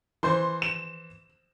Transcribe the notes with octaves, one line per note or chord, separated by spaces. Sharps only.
E3 C5 C6
E7